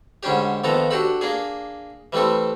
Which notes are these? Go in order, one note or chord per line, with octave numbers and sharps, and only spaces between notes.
G#2 D3 G3 C#4 D4 G4
A#1 D#3 F3 B3 A4 A#5
D4 F#4 G4 A4 B5
A#3 D4 G#4
E3 G3 A3 C4 A4